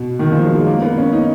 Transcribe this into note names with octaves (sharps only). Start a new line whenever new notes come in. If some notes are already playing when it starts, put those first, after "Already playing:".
Already playing: B2
D#3
F3
F#3
G#3
A#3
B3
C#4
D#4